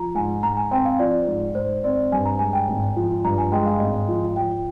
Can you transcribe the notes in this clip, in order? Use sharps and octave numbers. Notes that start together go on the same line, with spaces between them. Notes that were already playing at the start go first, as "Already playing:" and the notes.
Already playing: F3 A#5
G#2 G#5
G#2 A#5
G#5
C4 G5
F5
F3 D5
G#2
G#2 C5
C4 D5
G2 G#5
A#5
G#3 G#5
G5
G#1
F3
G2 A#5
G#5
G#3 G5
F5
G#1 D#5
F3
F3 G5